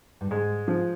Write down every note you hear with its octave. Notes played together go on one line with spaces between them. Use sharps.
G2
G#2 G#3
F3